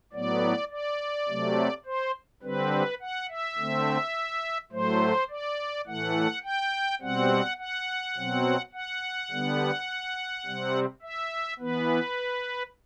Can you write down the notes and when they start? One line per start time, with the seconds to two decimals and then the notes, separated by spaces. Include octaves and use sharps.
0.13 A2 F#3 B3 D5
0.71 D5
1.29 C3 F#3 A3
1.86 C5
2.43 D3 G3 C4 B4
3.01 F#5
3.29 E5
3.57 D3 A3 C4
4.72 A2 F#3 A3 C5
5.29 D5
5.87 A2 E3 A3 F#5
6.43 G5
7.01 B2 G3 C4 F#5
7.59 F#5
8.17 B2 F#3 C4
8.73 F#5
9.31 D3 G3 B3
10.46 C3 G3 C4
11.02 E5
11.59 E3 B3 B4